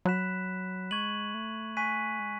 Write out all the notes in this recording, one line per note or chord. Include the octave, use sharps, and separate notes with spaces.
F#3 B5 F#6 B6 E7
G#3 C#6 G#6 D#7 F#7
A3
G#5 C#6 F#6 B6 D#7
G#3